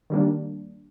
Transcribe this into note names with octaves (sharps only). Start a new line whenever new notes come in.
D#3 G3 A#3 D4